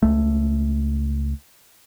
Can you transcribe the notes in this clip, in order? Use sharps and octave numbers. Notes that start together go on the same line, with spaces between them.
C#2 A3